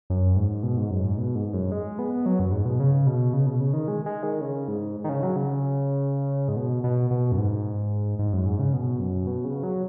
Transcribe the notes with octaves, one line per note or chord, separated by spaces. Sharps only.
F#2
G#2
B2
G#2
F#2
G#2
B2
G#2
F#2
G#3
B3
F#3
F#2
G#2
B2
C#3
B2
C#3
B2
C#3
D#3
G#3
G#3
D#3
C#3
G#2
D#3
C#3
F#3
C#3
G#2
B2
B2
B2
F#2
G#2
G#2
F#2
G#2
C#3
B2
F#2
B2
C#3
F#3